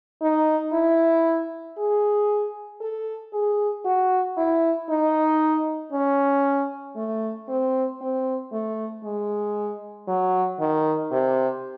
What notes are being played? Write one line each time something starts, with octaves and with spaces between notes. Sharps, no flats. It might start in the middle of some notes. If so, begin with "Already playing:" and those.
D#4
E4
G#4
A4
G#4
F#4
E4
D#4
C#4
A3
C4
C4
A3
G#3
F#3
D#3
C3